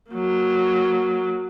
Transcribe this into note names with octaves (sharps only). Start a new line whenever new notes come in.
F#3 A#3